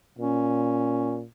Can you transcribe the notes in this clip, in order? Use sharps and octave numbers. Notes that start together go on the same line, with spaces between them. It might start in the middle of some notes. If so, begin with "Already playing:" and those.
A#2 C#4